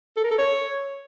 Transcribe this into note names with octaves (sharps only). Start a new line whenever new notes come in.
A4
A#4
A4
C#5